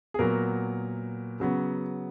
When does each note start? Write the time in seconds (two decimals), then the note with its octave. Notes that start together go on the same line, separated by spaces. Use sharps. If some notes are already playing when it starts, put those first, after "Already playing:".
0.14 G#4
0.19 A#2 F#3 B3 A#4
1.40 C#3 F#3 B3